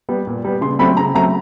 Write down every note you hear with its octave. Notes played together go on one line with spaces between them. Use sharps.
G3 B3
A#2
G3 B3
C#3 C6
F#3 A3 C4 B5
C#3 A#5
F#3 A3 C4 A#5